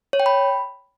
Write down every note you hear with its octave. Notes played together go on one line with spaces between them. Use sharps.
C#5
G5
B5